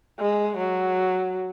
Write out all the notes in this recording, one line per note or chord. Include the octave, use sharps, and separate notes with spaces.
G#3
F#3